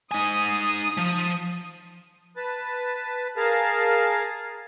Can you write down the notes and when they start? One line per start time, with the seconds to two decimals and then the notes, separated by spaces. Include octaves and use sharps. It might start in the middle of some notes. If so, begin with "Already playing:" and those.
0.11 D#4 G#5 D#6
0.97 F3
2.36 B4 A5
3.37 G#4 A#4 F5 A5